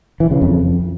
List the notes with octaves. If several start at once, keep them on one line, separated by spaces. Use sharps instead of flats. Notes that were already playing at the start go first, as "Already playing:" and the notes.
E3
C#3
F2